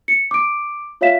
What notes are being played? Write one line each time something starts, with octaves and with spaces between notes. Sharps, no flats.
C#7
D6 D7
F4 C#5 E5 F5 B6 E7